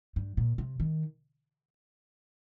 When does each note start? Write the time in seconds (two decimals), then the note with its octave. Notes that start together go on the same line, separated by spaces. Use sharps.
0.16 G2
0.37 A#2
0.58 C3
0.80 D#3